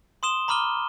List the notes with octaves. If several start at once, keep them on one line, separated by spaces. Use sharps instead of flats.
C6 D#6 E7 G7
A#5 B5 D6 F6 D#7 G7